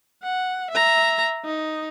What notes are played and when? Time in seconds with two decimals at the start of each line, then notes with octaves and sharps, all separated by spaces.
0.22 F#5
0.71 E5 A#5
1.45 D#4